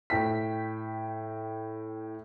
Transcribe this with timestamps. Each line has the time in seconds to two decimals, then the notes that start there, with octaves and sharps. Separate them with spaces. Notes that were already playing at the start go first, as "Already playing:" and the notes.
0.10 A2 G5 B6